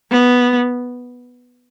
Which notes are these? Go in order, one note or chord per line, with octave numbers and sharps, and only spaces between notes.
B3